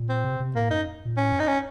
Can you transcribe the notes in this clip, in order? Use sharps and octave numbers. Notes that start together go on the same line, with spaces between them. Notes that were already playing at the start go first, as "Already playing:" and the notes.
Already playing: A#2
C4
C3
C3
A2 A#3
F#2 D#4
A#2
A2 C#4
F#2
D#4
C#4